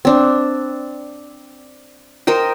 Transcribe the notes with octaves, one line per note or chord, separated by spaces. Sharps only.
C4 D4
A#4 C5 D#5 G5